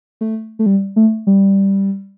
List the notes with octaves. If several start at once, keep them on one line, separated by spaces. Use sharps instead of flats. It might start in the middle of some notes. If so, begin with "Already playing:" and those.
A3
A3
G3
A3
G3